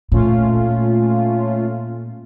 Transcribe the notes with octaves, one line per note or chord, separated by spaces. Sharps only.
A#2 A3 C#4 F4